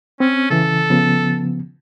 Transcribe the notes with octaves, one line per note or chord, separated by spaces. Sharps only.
C4 C#4
C#3 E3 A4
C#3 F3 B3